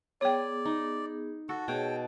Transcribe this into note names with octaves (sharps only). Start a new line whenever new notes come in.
B3 G#4 C#5 D5 G5
D#4
F#4 A4
B2 G#4 C#5 G5